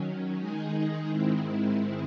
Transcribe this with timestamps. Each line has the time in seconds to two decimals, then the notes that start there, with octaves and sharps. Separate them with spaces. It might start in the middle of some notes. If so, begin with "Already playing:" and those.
Already playing: D#3 F#3 C#4
0.39 D#3 G#3 D#4 G#4
1.09 G#2 D#3 G#3 C4 E4